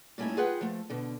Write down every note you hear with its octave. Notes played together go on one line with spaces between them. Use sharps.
A#2 G3 A3 C#4 D#4 E4
F4 G#4 B4 F#5 G5
F3 A3
B2 D3